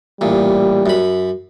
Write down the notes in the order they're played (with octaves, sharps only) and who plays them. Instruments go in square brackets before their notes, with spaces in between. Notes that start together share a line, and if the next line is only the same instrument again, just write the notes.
[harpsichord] A1 A#2 [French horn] G3
[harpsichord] F#2 B5